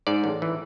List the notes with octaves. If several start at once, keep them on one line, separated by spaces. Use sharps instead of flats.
G#2 D5
A1
E3